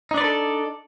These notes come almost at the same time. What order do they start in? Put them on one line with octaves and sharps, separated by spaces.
D#4 D4 D5 B4 A4